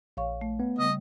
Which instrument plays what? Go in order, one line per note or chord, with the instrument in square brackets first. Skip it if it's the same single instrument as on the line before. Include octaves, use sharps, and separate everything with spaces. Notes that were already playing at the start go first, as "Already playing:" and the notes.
[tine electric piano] A#1 [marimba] C#5 F5 C#6
[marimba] A3
[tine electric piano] B3
[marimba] C#3 G3 [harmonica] D#5